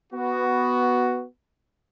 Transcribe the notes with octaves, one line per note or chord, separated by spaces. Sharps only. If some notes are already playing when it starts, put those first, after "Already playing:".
B3 F#4